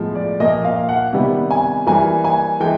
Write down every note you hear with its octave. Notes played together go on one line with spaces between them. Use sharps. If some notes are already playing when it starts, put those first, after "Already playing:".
Already playing: A2 F3 G#3 B3
D5
A#2 F3 A#3 D#5
F5
F#5
C3 D#3 G3 B3
G#5
E3 G3 A#3 G#5
G#5
E3 G#3 G5